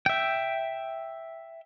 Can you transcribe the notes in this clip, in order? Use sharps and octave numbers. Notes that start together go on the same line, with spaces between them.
E5 G5